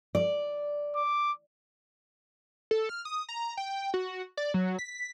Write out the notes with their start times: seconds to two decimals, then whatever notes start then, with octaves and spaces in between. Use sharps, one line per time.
0.15 D5
0.95 D6
2.71 A4
2.89 F6
3.05 D#6
3.29 A#5
3.57 G5
3.94 F#4
4.37 D5
4.54 F#3
4.79 B6